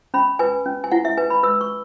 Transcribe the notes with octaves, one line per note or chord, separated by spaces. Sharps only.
C#4 B5
B4 G#5
C#4
G#5
E4 F#5
E5
B4 G#5
B5
B4 E6
C#6